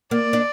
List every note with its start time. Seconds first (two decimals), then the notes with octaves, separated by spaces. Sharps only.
0.11 A#3 D5
0.33 D4